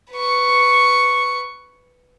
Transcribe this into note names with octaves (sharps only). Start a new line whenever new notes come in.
B4 C#6